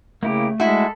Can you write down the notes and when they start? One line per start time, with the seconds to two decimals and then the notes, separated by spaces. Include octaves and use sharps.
0.23 C#3 A3 A#3 E4 G4
0.60 G#3 E4 F#4 A4